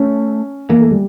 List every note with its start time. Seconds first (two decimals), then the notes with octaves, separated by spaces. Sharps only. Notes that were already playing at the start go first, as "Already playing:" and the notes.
Already playing: A3 C#4
0.69 E3 A#3
0.80 A3
0.91 G3